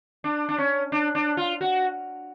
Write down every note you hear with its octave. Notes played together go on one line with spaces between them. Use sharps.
D4
D4
C#4
D4
D4
F4
F#4